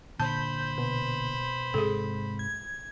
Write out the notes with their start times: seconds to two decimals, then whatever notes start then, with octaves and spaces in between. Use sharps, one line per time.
0.20 A#2 D3 C5 A5 B5 G6
0.78 B2
1.74 G#2 C3 G#3 G#4 A4
2.39 G#6